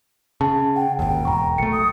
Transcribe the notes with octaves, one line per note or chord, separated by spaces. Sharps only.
C#3 A5
F#5 G5
G#1 D#2 G5
E1 A#5 C#6
B1 A3 C#7
D#6